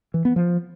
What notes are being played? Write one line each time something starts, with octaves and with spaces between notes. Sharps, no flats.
E3
B3
F3